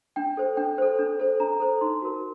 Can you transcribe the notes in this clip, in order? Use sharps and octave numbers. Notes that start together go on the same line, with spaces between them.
D4 G5
A4 C5
D4 G5
A4 C5
D4
A4 C5
D4 A#5
A4 C5
D#4 C6
F#4 A#4